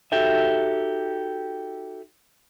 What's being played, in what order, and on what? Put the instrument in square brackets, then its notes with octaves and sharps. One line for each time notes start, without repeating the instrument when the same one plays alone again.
[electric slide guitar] D#4 F#4 G4 A4 E5